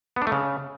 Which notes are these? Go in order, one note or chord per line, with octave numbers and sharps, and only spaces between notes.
B3
D4
A3
C#3